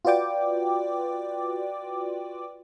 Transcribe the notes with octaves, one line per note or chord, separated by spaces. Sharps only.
F4 F#4 B4 D5 G5 D6